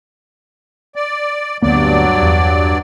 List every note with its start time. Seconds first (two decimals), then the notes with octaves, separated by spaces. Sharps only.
0.96 D5
1.62 D2 G2 F#3 A#3 B3 D5
2.22 E2